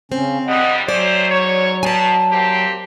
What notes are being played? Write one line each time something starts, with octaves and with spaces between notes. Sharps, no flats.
C#3 C4 C#4
F2 D3 G3 D#5 F#5
F#3 A3 C#4 C5 D5
G#2 C#5
B2 G#5 A5
A#3 C4 G4